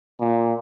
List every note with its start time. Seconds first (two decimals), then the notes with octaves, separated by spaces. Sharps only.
0.20 A#2